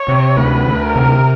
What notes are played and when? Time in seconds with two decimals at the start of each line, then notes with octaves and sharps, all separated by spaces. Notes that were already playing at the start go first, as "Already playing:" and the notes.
Already playing: C#5
0.08 C3
0.37 D2 B4
0.67 D2
0.81 A#4
0.96 C3